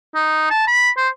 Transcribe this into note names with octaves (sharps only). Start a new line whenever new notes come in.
D#4
A5
B5
C5